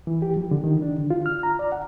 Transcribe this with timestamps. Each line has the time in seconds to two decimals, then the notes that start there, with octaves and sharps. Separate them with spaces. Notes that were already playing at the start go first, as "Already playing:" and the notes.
0.07 E3
0.22 G4
0.37 F3
0.51 D3
0.64 D#3
0.82 D4
0.98 D3
1.10 F4
1.26 F6
1.43 A#5
1.59 D5
1.72 F#5